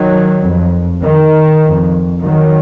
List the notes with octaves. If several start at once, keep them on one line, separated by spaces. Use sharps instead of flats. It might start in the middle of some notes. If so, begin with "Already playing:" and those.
Already playing: D#3 F#3
F2
D#3
F2
D#3 F#3